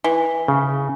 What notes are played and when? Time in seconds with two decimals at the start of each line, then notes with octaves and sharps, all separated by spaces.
0.04 E3
0.48 C#3